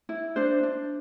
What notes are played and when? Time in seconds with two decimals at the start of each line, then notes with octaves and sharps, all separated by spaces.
0.09 E4
0.36 D4 C5
0.63 D4